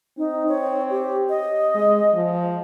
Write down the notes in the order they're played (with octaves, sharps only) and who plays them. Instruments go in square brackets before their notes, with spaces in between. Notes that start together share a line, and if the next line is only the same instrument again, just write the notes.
[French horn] C4 [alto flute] D#4
[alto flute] C#5
G4
D#5
[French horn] G#3
F3